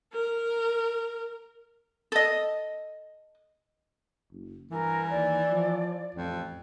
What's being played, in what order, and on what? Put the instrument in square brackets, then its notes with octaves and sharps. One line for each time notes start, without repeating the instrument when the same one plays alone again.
[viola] A#4
[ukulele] A4 D#5
[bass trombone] F#1
[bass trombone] G2 [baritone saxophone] E3 [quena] A#4
[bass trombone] D#2 [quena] D5
[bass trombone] F3
[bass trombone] A1 [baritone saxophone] F2